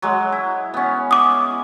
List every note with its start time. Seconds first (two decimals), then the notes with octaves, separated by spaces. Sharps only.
0.02 F#3 G#3
0.32 E4
0.74 B3 C#4
1.11 D6 D#6